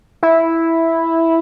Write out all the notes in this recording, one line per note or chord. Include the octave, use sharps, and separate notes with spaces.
E4